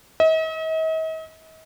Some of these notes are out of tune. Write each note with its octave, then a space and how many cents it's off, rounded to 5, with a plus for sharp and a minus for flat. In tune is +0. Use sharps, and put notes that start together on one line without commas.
D#5 +45